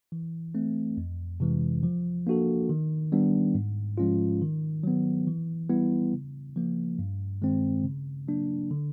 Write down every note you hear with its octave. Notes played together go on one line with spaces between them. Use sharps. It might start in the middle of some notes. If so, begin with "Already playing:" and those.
E3
A3 C4
F2
C3 E3 G#3
F3
A#3 D4 F#4 A4
D#3
G3 B3 D4
G#2
F3 G#3 C#4 F4
D#3
F#3 B3
E3
G3 B3 E4
C#3
F3 A#3
G2
D#3 G#3 C4
C#3
F#3 A#3 D4
D3